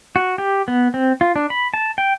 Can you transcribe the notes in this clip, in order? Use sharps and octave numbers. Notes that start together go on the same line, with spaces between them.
F#4
G4
B3
C4
F4
D4
B5
A5
G5